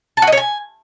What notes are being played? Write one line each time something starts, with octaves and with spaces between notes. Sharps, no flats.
A5
F#4
D#5
C#5
G#5